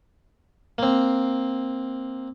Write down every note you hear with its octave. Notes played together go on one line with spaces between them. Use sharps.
A#3 C4